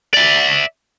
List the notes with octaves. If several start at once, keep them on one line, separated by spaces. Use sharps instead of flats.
D5 E5